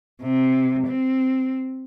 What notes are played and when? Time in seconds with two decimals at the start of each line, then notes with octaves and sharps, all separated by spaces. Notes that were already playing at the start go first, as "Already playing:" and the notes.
0.22 C3
0.87 C4